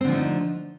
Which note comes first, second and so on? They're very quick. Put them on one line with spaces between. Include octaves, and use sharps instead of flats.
C4 D3 F3 A3 D#4